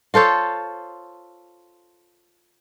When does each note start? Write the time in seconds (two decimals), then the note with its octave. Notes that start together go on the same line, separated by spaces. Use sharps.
0.14 F4 A4 C5 C#5